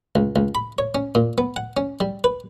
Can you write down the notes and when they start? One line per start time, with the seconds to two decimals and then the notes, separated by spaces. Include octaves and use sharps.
0.15 C#2
0.36 C#2
0.55 B5
0.78 C#5
0.95 C#4
1.15 A#2
1.38 B3
1.56 F#5
1.77 C#4
2.00 G3
2.24 B4